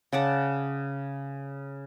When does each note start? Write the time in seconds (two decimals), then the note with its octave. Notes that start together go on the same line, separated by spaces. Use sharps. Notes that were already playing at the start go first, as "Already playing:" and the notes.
0.13 C#3 D5 F#5 A5